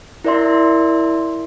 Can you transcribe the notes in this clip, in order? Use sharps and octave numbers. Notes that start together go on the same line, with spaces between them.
E4 A#4 D5 E5 C6